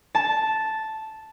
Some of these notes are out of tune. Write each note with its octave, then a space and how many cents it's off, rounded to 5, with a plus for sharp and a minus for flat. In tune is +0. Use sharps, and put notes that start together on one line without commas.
A5 -5